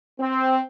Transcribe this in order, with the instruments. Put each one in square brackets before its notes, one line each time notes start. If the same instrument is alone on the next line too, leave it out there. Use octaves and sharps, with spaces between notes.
[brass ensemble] C4